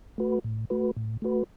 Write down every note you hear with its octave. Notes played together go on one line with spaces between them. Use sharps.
A3 F#4 B4
A2
A3 F#4 B4
A2
A3 F#4 B4